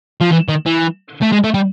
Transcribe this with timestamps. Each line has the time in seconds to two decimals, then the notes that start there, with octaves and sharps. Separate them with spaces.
0.21 F3
0.32 E3
0.49 D#3
0.66 E3
1.22 A3
1.32 G#3
1.44 A3
1.54 G3